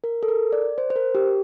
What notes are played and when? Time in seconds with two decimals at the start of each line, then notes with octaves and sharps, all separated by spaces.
0.04 A#4
0.23 A4
0.28 A#4
0.52 D5
0.78 C5
0.90 C5
0.96 A#4
1.15 G4